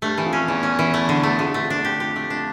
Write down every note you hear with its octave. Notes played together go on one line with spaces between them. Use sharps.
G2 A3
E3
F2
C#4
E2 E3
C#4
E3
A3
D3
A3
F2 D3
G2 A3
F2
E2 D4
F2 G4
G4
A3
D4